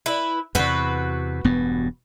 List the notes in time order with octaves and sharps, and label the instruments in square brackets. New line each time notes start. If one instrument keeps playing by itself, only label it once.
[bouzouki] E4 B4
[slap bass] E2 C3 [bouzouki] F#4 B4
[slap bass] E1 G2 B3